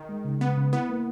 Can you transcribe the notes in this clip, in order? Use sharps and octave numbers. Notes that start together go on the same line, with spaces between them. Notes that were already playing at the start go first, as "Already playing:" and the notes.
Already playing: D#3
G#3
C#3
C#3 B3
C#3
B3 E4
A#3